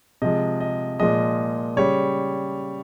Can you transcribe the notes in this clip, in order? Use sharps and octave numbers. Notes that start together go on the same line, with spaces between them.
C3 F3 G#3 D#5
D#5
A#2 F3 G#3 D#5
C#3 G3 C#5